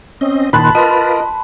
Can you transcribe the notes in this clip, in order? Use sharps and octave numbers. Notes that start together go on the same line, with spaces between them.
C4 C#4 D#5
A#2 D#3 A5 B5 C6 F#6
F4 A#4 B4 D#5 A5